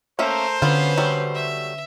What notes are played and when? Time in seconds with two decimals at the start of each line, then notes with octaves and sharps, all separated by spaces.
0.19 A3 A#3 C#4 A#4 C5 E5
0.62 D3 F#3 B3 C#4 F4 B4
0.98 F#3 G3 A3
1.35 E5